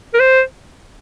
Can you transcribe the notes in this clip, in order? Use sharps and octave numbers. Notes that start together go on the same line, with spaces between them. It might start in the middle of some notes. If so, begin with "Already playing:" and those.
A#4
C5